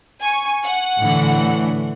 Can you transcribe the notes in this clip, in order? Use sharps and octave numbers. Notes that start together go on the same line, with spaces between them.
G#5 C#6
F#5
A2 D3 E3